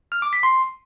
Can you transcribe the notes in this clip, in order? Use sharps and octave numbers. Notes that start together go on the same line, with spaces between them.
F6
D6
B6
C6